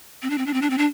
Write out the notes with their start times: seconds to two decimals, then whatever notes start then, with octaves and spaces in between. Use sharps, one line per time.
0.22 C4
0.30 D4
0.38 C4
0.46 D4
0.54 C4
0.62 D4
0.70 C4
0.78 D4